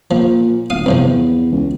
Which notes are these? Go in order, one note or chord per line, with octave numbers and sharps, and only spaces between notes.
A#2 F3
D1 F5 D#6
E2 G2 C3 F3
C#2